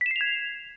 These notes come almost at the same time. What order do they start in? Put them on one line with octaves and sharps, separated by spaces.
B6 E7 C7 F7 G#6